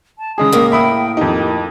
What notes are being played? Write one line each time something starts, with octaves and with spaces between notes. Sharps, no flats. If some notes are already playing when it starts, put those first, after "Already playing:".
A5
C#3 G#3 G#4 D#6
A2 A#3
E5 G5 B5 D#6
F2 D#4 G4